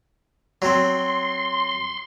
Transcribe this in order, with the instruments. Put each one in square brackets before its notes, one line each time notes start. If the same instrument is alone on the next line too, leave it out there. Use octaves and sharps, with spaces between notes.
[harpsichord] F#3 C4 [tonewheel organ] C6